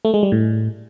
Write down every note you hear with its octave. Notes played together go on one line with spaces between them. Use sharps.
A3
G#3
G3
A2